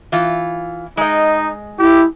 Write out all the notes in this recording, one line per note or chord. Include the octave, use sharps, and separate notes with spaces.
E3 F4
G#3 D#4 D#5
E4 G4